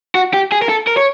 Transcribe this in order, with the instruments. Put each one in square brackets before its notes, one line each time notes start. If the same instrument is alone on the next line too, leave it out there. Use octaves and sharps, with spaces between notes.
[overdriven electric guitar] F#4
G4
G#4
A#4
A4
A#4
C#5